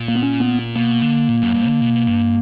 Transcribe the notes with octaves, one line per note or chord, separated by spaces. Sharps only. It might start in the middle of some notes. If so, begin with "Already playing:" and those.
Already playing: A#2
A#3
B3
C#4
B3
B2 A#3
D3
A#2
F#2
G2
D3
B2
G2